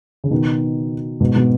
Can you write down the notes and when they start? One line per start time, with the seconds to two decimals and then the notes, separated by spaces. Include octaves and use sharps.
0.24 C#3
0.31 B2 D#3
1.20 G#2 B2
1.36 B2